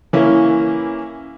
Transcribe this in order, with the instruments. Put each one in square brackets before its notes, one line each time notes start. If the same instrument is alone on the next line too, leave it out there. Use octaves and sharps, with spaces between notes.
[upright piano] E3 A#3 C#4 E4